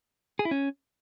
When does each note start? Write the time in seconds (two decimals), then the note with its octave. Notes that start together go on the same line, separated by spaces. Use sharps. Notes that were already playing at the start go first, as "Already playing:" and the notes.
0.39 G#4
0.45 E4
0.51 C#4